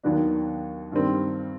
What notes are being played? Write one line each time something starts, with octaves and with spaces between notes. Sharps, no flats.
D#2 D#3 F#3 B3 D4
G2 D#3 G3 C4